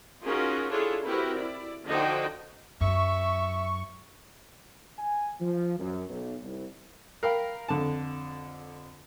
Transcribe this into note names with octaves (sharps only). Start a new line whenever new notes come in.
C#4 D#4 F4 F#4 G#4 A#4
D4 E4 F4 G#4 A4 C#5
C4 E4 F#4 G4 A#4 B4
E4 D5
D3 F3 D4 D#4 F#4 G5
F#2 E5 C#6
G#5
F3
F#2
B1
C2
A#4 F5 G5 B5
F2 D3 A5